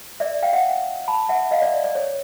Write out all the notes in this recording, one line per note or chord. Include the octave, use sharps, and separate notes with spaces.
D5 E5
F5 G5
E5 F#5
A5 B5
E5 F#5
D#5 F5
D5 E5
D5
C#5